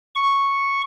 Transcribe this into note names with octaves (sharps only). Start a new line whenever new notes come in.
C#6